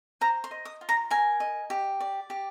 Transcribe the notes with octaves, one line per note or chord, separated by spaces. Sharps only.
C5 A#5
C6
D#5
D#6
F4
A#5
A#4 G#5
D#5
G4
D5
G4